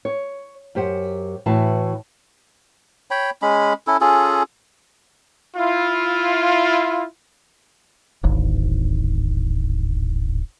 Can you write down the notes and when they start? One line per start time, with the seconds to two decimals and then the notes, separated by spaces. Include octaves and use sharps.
0.05 C#5
0.75 F#2 G4 C5 F#5
1.46 A2 E3 F#4 B4 F5 A5
3.11 C#5 G5 B5
3.42 G#3 C#4 B5
3.87 C#4 E4 A4
4.01 C#4 F4 G#4 A4
5.56 E4 F4
8.23 D1 G#1